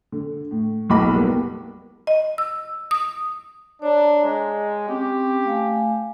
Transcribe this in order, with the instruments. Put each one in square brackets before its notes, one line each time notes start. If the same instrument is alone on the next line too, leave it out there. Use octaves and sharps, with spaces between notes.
[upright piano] D3
A2
F#1 B1 F#4 D#5 B5 D6
G3 A#3 B3
[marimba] D#5
E6
D#6
[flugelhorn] D4 [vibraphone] C#5 A#5
[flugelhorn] G#3
[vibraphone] C4 C#4 [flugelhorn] G4
[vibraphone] A3 F5 G#5